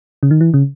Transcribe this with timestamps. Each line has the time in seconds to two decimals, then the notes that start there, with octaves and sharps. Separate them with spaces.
0.23 C#3
0.31 D#3
0.41 E3
0.54 C#3